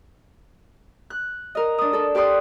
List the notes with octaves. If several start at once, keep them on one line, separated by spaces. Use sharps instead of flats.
F#6
A#4 D#5
D4 D#6
D4 A4
G4 B4 D5 C6 D#6 F#6